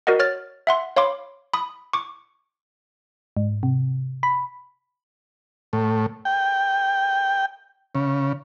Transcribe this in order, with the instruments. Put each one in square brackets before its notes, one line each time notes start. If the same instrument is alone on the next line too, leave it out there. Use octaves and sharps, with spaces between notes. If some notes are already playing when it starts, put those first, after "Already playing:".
[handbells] F#4 A#4 D5 D#5 F#5
C#5 F6 A6
E5 F#5 C6
C#5 F5 B5 C6 D6
B5 D#6
C#6 D6
[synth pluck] G#2
C3
B5
[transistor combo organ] A2
G5
C#3